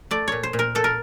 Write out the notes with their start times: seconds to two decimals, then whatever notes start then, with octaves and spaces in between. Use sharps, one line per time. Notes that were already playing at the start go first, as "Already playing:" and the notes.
0.11 A3 D5
0.28 A#2 C#5
0.43 C5
0.53 A#2
0.59 A#4
0.75 A#2 A4
0.84 A#4